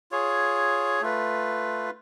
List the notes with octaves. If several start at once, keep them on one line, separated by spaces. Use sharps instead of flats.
F4 G#4 C#5
A3 F4 B4